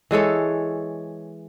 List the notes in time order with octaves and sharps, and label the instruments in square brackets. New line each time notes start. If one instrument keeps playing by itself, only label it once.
[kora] E3 G#3 A4 C#5